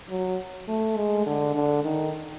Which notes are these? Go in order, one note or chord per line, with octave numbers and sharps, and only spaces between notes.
F#3
A3
G#3
D3
D3
D#3